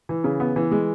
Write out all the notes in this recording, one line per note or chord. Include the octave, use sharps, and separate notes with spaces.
E3
C#3
B3
E3
G#3